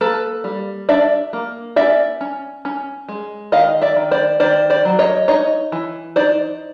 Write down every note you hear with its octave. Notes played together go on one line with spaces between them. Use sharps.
A#3 A4 B4
G3
D4 D5 E5
A#3
C#4 D5 E5
C#4
C#4
G#3
D#3 D#5 F5
D5 E5
D#3
C5 D5
D#3 C5 D5
C5 D5
F#3
C#5 D#5
D#4 C#5 D#5
E3
D#4 C5 D5